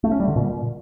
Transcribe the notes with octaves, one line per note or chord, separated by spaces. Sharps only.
A3
C#4
G3
D3
A#2